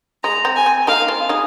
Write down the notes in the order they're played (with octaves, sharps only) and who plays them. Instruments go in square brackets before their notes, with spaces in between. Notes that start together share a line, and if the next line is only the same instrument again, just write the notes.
[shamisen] G#3 [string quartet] A#5
[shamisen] C4
[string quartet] G#5
[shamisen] C4
[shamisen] A#3 D#4 [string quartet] F5
[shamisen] C4 F4
D#4 G#4